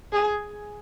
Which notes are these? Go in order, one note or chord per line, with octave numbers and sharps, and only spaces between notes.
G#4